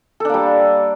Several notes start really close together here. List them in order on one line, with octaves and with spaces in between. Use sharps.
A4 D4 A#3 G3